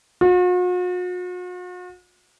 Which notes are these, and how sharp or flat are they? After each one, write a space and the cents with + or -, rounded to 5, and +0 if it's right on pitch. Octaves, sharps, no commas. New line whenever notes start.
F#4 -45